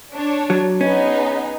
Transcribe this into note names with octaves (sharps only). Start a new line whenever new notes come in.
D4 C#5
F#3
B3 C#4 D#4 G#4